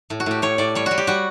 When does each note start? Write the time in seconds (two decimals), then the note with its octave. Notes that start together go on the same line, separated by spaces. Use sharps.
0.10 A2
0.20 F#4
0.26 A2 G4
0.42 A2 C#5
0.58 A2 D5
0.75 G3 C#5
0.86 G3 F#4
0.98 G4
1.07 G3 F#4